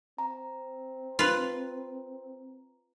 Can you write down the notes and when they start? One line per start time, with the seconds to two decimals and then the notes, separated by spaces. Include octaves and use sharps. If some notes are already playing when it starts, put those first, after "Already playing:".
0.18 C4 A#5
1.19 F4 B4